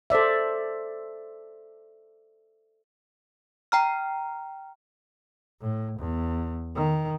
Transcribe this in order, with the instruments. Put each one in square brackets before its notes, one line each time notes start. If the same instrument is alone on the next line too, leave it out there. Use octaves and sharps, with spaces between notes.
[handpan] A4 C5 D5 E5
[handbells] G5 A#5 F6
[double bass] A2
E2
D#3